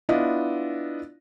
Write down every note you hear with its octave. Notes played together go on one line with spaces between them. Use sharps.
B3 D4 E4 F4 D#5